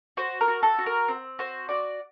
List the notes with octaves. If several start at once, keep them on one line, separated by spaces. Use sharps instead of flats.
F#4 C5
A#4
F#4
A4
F#4
A#4
C4
F#4 C5
F#4 D5